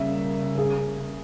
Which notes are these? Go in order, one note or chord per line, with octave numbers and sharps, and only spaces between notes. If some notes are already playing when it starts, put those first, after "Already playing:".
Already playing: C#3 G3 A#3 E5
G#4